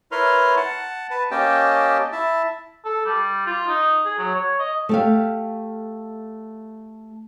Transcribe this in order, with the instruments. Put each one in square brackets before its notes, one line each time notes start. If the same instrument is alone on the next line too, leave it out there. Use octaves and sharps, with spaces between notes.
[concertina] E4 A#4 B4 C#5 C6 F6
F#5 A5
B4 A5
A#3 C#4 G4 D#5 G5 A5
E4 E5 A5
[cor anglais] A4
G3
F4
D#4
G#4
F#3
C#5
D#5
[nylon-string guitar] A3 G4 F5